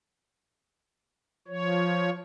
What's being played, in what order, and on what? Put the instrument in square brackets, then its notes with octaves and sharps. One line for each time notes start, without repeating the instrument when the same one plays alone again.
[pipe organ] F3 C#5